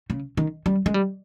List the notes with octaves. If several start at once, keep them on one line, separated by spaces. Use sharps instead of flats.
C#3
D#3
G3
G#3
G3